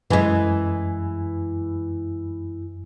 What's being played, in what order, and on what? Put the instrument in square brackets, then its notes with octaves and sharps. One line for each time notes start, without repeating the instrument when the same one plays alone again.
[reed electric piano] F#2 G#5 [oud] E3 G#3